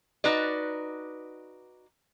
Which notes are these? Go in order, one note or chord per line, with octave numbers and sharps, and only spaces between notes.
D#4 F#4 B4 D5